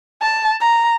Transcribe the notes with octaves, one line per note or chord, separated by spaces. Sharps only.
A5
A#5